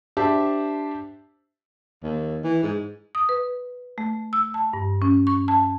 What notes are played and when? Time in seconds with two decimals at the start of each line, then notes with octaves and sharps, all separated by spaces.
0.17 D4 G4 C5 E5 A5
2.03 D#2
2.44 E3
2.63 G#2
3.15 D#6
3.29 B4
3.98 A3
4.33 E6
4.54 A5
4.73 G2
5.02 C#4
5.27 C#6
5.48 A5